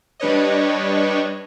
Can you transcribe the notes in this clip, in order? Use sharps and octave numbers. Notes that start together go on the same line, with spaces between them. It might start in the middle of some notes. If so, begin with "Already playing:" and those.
G3 D4 B4 C#5 D#5